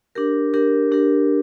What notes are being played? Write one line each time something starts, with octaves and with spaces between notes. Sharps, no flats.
D4 G4 A#4
D4 G4 A#4
D4 G4 A#4